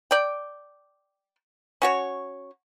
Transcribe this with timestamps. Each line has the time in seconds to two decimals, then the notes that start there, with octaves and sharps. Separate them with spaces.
0.11 D5 G5
1.82 C#4 F#4 C#5